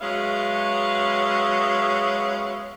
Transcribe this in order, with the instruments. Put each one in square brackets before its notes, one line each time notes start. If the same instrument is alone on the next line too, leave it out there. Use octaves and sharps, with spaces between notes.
[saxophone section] F#3 G#3 B3 C#4 E5 F5